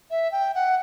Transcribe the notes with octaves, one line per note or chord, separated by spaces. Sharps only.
E5
G5
F#5